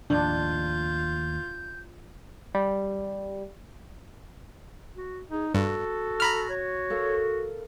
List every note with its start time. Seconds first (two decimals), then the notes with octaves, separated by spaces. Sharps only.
0.10 D#2 A2 F3 D4 F4 G6
2.54 G3
4.96 F#4
5.31 D#4 G#4
5.54 G2 F#4 A4
6.20 A#5 B5 F6
6.49 C#5
6.90 A4 A#4 F5